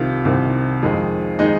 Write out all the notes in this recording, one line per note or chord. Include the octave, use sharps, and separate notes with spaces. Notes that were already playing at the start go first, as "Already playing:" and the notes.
Already playing: C2 C3 D#3 F4
C2 C3 D#3
F2 D#3 G#3
D#3 G#3 D#4